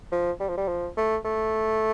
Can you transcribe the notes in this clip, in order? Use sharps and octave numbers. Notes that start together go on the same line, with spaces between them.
F3
G3
F3
G3
F3
A3
A3